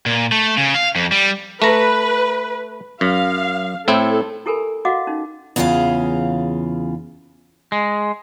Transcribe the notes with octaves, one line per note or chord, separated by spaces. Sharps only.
A#2
A3
C#3
F5
F2
G3
A3 B4 A#5
F#2 F5
A2 C4 E4 A4
E4 G4 A4 A#4 G#5 B5
F#4 D#5 F5 F#5 D6
C#4 D#4
E2 C#3 E4 F4 G#4 F5
G#3